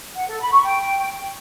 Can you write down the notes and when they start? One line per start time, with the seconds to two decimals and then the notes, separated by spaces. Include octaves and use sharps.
0.16 F#5
0.28 A4
0.40 B5
0.52 C#6
0.64 G5